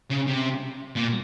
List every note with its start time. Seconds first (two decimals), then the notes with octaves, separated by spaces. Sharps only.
0.10 C#3
0.27 C3
0.96 A#2